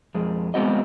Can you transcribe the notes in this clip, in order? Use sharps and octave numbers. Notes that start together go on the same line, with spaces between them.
F2 G#3
G#3 B3 C4 F#4 D#5